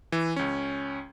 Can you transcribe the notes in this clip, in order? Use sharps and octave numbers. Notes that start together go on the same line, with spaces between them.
E3
C#2 C#4